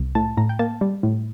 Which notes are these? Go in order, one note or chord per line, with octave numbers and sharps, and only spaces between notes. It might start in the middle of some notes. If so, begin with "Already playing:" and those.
Already playing: C2
A2 A5
A2 A#5
G5
A#3 A5
G3
A2